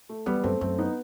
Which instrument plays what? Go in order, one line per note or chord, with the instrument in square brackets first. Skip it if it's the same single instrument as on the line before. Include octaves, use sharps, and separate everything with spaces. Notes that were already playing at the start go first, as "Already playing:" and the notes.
[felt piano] A3
[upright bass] E2 [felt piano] G3 B3
[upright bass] F#2 [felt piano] A3 C4
[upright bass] F#2 [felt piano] A3 C4
[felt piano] B3 D#4